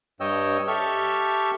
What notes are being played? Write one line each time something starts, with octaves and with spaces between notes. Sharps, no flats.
G2 C#5 D#5 G5 E6
G4 A4 E5 C#6 F6